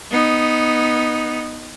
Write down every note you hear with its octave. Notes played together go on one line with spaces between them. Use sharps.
B3 D#4